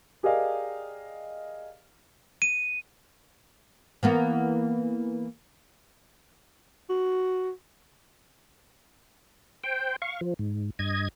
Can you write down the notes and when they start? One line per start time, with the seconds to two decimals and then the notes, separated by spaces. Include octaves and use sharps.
0.23 G4 G#4 A#4 D5 D#5 F5
2.42 D#7
4.03 E3 A#3 B3
6.89 F#4
9.64 C5 G5
10.02 F5 C#6
10.21 F3
10.39 G#2
10.79 G2 D#5 G#6